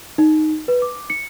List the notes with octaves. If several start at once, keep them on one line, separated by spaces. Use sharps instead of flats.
D#4
B4
D6
C#7